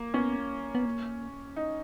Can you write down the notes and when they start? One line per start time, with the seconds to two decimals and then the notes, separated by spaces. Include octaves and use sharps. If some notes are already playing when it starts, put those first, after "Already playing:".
Already playing: A#3
0.14 B3 C#4
0.75 B3
0.85 A#3
1.56 D#4